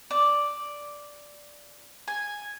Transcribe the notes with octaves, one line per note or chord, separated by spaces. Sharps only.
D5
G#5